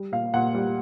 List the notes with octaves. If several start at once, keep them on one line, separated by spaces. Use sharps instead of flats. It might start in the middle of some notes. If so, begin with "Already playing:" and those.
Already playing: G3
A#2 F5
A#2 F#5
G3